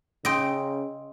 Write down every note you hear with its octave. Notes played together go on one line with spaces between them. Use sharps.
C#3 C#4 D#5 G5 C6 E6